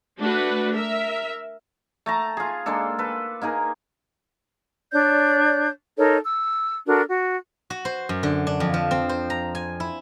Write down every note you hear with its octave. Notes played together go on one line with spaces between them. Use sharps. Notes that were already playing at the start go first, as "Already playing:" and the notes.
A3 D4 F#4 B4
A#4 E5
A3 A5 A#5
F4 G#4
G#3 A#3 D4 A4
A4 B4
A#3 D#4 G#4 A#4
D4 C#5 D5 G6
D#4 A4 A#4 C#5
E6
D4 F#4 A4 A#4
F#4
F#4
C5
F#2
D3
D4
F2
F3
C4
C5
A#5
G#5
E4